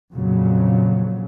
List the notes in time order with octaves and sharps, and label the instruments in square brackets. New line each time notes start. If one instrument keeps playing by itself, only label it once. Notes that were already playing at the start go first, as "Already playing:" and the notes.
[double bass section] F2 A#2 C#3 F#3